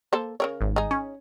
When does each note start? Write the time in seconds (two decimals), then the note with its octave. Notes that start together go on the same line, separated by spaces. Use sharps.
0.13 A#3 A4 C5
0.40 C#3 A#4 C#5
0.61 G#1
0.76 D#4 G#4
0.91 C#4